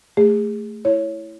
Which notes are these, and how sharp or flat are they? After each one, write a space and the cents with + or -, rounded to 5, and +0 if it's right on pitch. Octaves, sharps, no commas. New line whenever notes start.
A3 +0 G#4 -25
E4 +5 C#5 +0